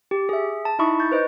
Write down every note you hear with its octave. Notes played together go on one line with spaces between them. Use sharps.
G4
G#4 E5
A5
D#4 E4 E5 B5 C#6 D#6
C#6 G6 A6
B4 C5 D#5